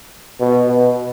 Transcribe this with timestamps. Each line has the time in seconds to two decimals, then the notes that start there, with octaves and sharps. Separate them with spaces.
0.40 B2
0.68 B2